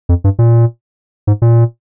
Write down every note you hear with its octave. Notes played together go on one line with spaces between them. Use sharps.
F2
G2
A#2
G#2
A#2